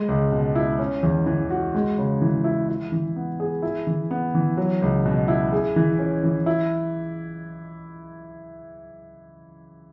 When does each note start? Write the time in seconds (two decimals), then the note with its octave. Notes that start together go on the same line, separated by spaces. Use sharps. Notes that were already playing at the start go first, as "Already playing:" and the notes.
Already playing: G#3
0.08 C#2
0.32 B2
0.55 E4
0.79 C#4
1.03 E2
1.26 E3
1.50 F#4
1.75 G#3
1.98 C#3
2.21 E3
2.44 E4
2.69 E4
2.92 E3
3.16 B3
3.40 G#4
3.62 E4
3.87 E3
4.11 B3
4.35 E3
4.57 F#3
4.82 C#2
5.05 B2
5.28 E4
5.52 G#4
5.76 E3
5.99 C#4
6.24 E3
6.46 E4